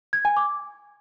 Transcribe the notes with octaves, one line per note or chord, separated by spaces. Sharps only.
G#6
G#5
D6